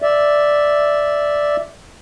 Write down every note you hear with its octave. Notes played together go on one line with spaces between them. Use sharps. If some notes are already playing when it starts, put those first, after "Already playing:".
D5 E5